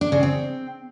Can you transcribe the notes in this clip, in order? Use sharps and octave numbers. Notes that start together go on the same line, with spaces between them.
D4
C#3
C4